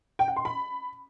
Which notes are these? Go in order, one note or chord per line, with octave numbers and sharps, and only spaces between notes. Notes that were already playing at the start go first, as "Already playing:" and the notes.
G5
F#5
C6
B5